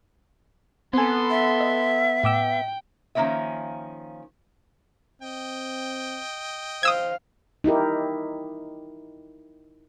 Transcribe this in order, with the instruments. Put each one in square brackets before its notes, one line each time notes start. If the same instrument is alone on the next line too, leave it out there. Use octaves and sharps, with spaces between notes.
[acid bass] B3 [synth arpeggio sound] C4 G#5 [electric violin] A4 C6
[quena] E5
[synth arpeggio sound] D#5
[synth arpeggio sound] A2 D6 E6 [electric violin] G5
[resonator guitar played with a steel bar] D#3 F3 A#3 C4 C#4 E5
[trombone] C4 [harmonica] D#5 G5
[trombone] C5 [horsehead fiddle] F5 [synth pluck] D#6 E6 G#6
[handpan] D#4 E4 G4 A#4